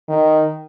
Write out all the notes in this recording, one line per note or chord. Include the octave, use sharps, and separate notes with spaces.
D#3